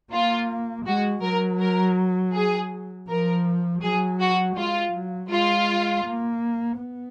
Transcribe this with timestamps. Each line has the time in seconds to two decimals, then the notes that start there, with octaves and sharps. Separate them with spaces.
0.12 A#3 F4
0.86 G#3 F#4
1.23 F#3 A#4
1.60 A#4
2.34 G#4
3.08 F3 A#4
3.82 F#3 G#4
4.20 F#4
4.56 G#3 F4
4.93 F#3
5.30 G#3 F4
6.05 A#3
6.79 B3